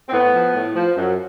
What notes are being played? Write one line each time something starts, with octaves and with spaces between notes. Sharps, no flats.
C4
A2 B3
F3
A2
F3
F#2